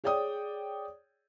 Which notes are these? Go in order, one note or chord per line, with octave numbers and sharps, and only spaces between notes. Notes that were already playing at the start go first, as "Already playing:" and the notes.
G#4 C#5 D5 G5 D#6